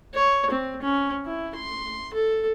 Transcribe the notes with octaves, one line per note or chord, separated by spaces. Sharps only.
C#5
C4
C#4
E4
C6
A4